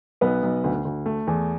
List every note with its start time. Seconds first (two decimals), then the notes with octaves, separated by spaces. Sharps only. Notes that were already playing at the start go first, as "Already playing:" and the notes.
0.21 B1 B3 B4
0.43 B1
0.64 D2
0.85 D2
1.06 A3
1.27 E2